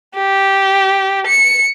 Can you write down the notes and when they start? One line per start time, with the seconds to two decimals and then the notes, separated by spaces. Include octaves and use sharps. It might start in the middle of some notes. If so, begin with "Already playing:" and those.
0.16 G4
1.27 C#7